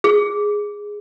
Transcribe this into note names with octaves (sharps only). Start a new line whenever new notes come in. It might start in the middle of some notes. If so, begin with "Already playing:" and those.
G#4